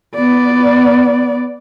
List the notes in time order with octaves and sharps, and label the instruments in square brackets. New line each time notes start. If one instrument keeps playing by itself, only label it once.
[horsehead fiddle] B3 D5